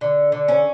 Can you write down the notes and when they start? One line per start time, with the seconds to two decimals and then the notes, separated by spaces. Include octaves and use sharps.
0.01 D3
0.32 D3
0.48 C#4